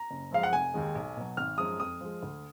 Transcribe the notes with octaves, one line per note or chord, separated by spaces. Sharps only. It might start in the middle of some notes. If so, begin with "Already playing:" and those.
Already playing: A#5
F#1
F#2 F3 G#3 F5
F#5
F1 G#5
D#2 D#3 G#3
B1
B2 F#3
G#1 F6
F#2 F3 G#3 D#6
F2 D#6
F3 G#3
D2